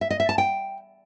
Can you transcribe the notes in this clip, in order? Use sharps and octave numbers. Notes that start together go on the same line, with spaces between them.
E5
D#5
E5
A5
G5